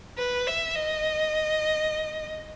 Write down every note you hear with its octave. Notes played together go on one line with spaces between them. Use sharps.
B4
E5
D#5